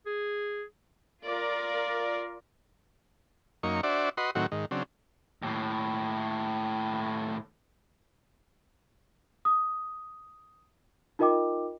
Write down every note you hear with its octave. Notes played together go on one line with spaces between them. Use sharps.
G#4
F4 A#4 D5
F#2 A#3 D#4 C#6
D4 F#4 C5 D5 E5
F#4 B4 D#5 C6
A2 D#3 F#3 C4 F#4
G#2 D#3
C#3 F#3 C4 D4
D#2 A2
D#6
D#4 F4 A#4 D#5 G5 D6